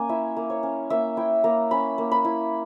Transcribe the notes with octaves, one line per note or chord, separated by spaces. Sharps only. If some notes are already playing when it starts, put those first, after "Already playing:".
Already playing: A#3 C#4 G#5
E4 E5
A#3
C#5
C#4
A#3 E5
E4 G5
A#3 A#5
C#4 B5
A#3
B5
E4